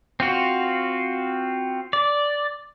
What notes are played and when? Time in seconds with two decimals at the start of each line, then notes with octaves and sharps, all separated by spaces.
0.20 C4 F4 F#4
1.93 D5